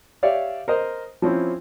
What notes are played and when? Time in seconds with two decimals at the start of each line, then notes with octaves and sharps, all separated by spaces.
0.23 G4 C#5 D5 E5 F5
0.68 A#4 C5 D#5
1.22 F3 C4 C#4 E4